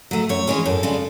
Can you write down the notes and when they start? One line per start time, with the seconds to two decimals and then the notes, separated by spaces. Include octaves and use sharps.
0.11 F#3 A3
0.29 F#2 C#5
0.47 E3 G#3 C#4
0.65 F#2 A4
0.83 C#3 G#3 D4